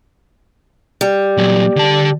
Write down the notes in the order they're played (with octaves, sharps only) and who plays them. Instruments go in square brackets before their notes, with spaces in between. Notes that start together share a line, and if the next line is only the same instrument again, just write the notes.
[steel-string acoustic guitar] G3
[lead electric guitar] A#2 F#3
D3 A5